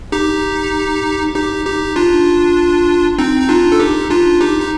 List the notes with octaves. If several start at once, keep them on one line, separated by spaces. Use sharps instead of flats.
D#4 G4
D#4 G4
D#4 G4
D4 F4
C4 D#4
D#4
D4 F4
A4
D#4 G4
D4 F4
D#4 G4
D#4